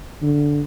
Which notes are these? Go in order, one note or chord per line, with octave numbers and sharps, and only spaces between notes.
D3